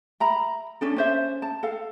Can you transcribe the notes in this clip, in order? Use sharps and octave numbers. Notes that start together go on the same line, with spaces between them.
E5 A#5 B5
C#4 D4 A4
C#4 C5 E5
A5
A4 F5